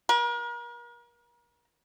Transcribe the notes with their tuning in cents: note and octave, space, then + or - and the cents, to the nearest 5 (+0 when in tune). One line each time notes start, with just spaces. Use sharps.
A#4 +40